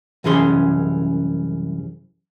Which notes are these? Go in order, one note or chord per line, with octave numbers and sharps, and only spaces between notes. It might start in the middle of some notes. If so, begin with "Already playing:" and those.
C2 F#2 E3 C#4 G#4 C6